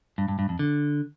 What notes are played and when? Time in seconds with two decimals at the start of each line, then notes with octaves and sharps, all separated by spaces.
0.18 G2
0.28 G2
0.39 G2
0.49 F2
0.59 D3